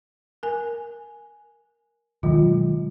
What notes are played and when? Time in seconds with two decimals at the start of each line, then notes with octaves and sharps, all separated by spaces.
0.43 A#4 G#5
2.23 B2 D#3 F#3 G#3 F4